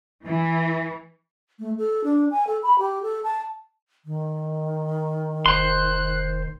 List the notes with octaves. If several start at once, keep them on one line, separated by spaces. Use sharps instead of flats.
E3
A3
A4
D4
G#5
A4
B5
G4
A4
A5
D#3
F1 C5 C6 F#6